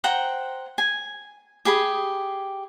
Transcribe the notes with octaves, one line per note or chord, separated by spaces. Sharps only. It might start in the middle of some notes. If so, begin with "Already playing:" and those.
C5 F#5 G5 A#5
G#5
G4 G#4 B5 D#6